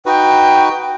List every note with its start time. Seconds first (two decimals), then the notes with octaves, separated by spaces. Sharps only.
0.06 D#4 F#4 B4 G5